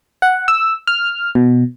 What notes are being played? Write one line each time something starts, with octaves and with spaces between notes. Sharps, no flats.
F#5
E6
F6
B2